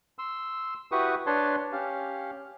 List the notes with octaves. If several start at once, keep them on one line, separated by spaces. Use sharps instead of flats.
C6 E6
E4 F#4 G4 B4 C#6 D#6
D4 B4 C#5 A5 C6
C#4 G4 F5